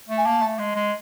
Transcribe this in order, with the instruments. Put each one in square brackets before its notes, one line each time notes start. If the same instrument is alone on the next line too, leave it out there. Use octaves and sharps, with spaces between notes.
[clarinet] A3
[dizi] G#5
[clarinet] A#3 [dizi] A5
[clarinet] A3
G#3
G#3